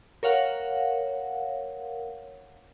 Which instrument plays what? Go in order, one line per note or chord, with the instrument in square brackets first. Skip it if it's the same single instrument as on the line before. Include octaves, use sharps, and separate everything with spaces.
[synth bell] A#4 C#5 F5 F#5